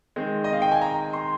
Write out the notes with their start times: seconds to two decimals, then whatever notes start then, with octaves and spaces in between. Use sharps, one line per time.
0.16 D#3 G#3 C4
0.44 D#5
0.53 F5
0.62 G5
0.72 G#5
0.81 A#5
1.13 C6